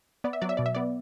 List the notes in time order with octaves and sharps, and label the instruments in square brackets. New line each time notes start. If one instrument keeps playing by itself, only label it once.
[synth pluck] B3 D5
E5
F#3 D5
E5
B2 D5
E5
B3 D5